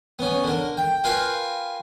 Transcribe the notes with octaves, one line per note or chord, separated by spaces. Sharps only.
B3 C#4
D3 A#4
G5
F4 A#4 B4 F5 G5 G#5